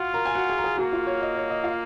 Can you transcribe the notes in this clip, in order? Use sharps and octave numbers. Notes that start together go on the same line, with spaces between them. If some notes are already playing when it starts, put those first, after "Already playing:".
Already playing: F4 F#4 F#5
A#4 A#5
G#5
F#4 F#5
G#4 G#5
A#5
G#4 G#5
A#3 F#4 F#5
F4 F5
C#5
D#5
C#5
D#5
F4 F5